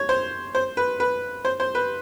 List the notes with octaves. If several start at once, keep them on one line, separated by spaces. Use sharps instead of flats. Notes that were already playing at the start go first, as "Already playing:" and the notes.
Already playing: C#5
C5
C5
B4
B4
C5
C5
B4